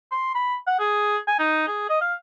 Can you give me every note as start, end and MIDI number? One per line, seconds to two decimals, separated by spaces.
0.12 0.32 84
0.35 0.56 83
0.67 0.79 78
0.80 1.17 68
1.28 1.37 80
1.39 1.67 63
1.67 1.88 68
1.89 1.99 75
2.01 2.14 77